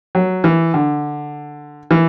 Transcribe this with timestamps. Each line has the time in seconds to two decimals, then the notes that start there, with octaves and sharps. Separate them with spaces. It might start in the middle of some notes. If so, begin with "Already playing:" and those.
0.15 F#3
0.44 E3
0.74 D3
1.91 E3